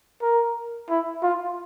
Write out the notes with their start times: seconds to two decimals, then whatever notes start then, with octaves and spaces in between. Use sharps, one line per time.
0.22 A#4
0.90 E4
1.23 F4